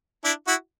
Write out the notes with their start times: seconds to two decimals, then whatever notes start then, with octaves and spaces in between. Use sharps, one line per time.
0.24 D4 E4
0.47 E4 F#4